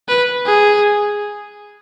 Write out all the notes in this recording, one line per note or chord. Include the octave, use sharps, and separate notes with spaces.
B4
G#4